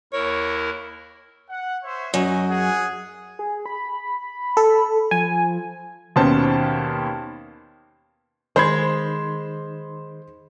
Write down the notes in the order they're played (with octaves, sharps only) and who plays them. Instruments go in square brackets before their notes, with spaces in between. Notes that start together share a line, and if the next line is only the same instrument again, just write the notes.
[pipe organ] D#2 E4 A#4 [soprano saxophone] C#5
[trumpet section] F#5
C5 C#5 E5
[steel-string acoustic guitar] F#2 [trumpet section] C#4 D#5
[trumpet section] G#4 F#5
[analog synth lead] G#4
B5
[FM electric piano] A4
[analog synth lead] F3 [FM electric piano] G#5
[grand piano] D#2 B2 C#4 C5 A5
[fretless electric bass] D#3 [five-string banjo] G#3 [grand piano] C5 B5 G#6